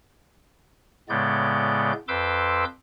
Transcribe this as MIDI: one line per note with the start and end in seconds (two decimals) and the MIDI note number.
1.09 1.92 45
1.09 1.92 49
1.09 1.92 56
1.09 1.92 59
1.09 1.92 74
1.09 1.92 91
2.08 2.64 41
2.08 2.64 71
2.08 2.64 84
2.08 2.64 86
2.08 2.64 88
2.08 2.64 91